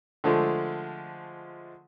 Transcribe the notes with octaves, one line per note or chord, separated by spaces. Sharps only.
D3 F3 G#3 A3